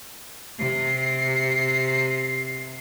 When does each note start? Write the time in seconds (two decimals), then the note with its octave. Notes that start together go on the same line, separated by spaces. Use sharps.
0.59 C3 C7